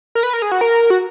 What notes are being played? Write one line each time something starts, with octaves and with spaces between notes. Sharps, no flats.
A#4
B4
A#4
G#4
F#4
A#4
F#4